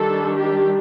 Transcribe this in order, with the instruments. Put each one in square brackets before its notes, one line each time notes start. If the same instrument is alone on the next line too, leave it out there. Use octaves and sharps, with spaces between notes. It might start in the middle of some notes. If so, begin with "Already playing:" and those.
Already playing: [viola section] D#3 G3 D4 A4
G4